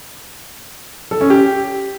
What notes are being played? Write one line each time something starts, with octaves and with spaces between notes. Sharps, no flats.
A4
C#4
G4